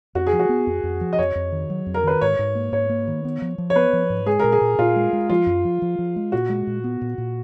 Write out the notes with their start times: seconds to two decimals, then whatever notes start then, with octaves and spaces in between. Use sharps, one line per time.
0.15 F2 F#4
0.27 G#4
0.33 F3
0.39 F#4
0.49 B3
0.67 F2
0.83 F2
1.01 F3
1.13 D#5
1.18 F2 C#5
1.35 F2
1.52 D#3
1.70 F#3
1.86 F2
1.94 A#4
2.04 D#3 B4
2.21 G#2 C#5
2.39 G#2
2.55 A#3
2.72 G#2 C#5
2.89 A#3
3.08 D#3
3.25 B3
3.42 F3
3.58 F3
3.70 C#5
3.76 B3 B4
3.93 F3
4.10 G#2
4.26 G#3 G#4
4.39 A#2 A#4
4.52 G#4
4.61 A#2
4.78 A#2 F4
4.96 G#3
5.13 G#3
5.29 F3 F4
5.46 F#2
5.65 F3
5.82 F3
5.99 F3
6.16 G#3
6.32 A#2 F#4
6.49 G#3
6.67 A#2
6.84 B3
7.01 A#2
7.18 A#2